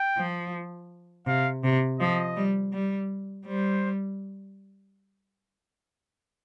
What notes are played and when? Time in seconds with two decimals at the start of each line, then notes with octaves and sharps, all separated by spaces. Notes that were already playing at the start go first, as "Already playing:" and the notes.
Already playing: G5
0.18 F3
1.27 C3 F5
1.64 C3
2.00 F3 D#5
2.36 G3
2.73 G3
3.46 G3 C5